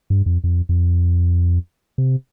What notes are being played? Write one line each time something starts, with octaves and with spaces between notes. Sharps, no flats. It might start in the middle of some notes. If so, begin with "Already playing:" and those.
G2
F2
F2
F2
C3